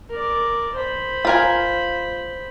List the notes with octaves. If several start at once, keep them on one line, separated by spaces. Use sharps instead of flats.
A#4 D5
C5 B5
F4 A#4 G#5